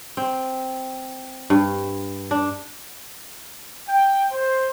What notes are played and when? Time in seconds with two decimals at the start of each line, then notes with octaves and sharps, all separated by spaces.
0.17 C4
1.50 G2
2.31 D4
3.89 G5
4.32 C5